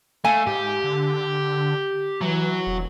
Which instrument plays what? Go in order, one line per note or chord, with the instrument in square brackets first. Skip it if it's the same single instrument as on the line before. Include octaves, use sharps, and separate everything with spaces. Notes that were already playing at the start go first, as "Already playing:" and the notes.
[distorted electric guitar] A3 [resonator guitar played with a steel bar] F5 G#5
[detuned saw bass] G#2 [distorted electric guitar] G4
[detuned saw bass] D3
[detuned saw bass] E3 [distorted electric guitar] F#3
[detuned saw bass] E1